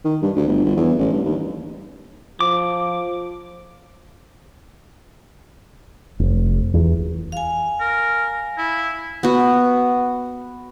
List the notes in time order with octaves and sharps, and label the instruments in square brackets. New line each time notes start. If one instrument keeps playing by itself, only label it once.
[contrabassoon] D#3
G2
D2
G1
G1
E2
A1
G2
D#2
[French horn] F3 [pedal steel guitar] D6
[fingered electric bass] F1
E2
[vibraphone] F5 G#5
[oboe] A#4
E4
[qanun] B3 F#4